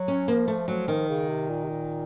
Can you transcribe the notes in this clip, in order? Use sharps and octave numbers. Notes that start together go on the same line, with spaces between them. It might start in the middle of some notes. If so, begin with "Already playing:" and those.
Already playing: F#3
C#4
F3 A#3
A3
F3 F#3
D#3
C#3
C3
A#2
C3
A#2